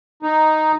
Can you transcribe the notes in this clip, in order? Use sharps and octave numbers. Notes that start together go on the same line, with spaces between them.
D#4